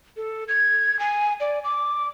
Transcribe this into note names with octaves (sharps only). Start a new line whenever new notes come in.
A4
G#6
G#5
D5
D6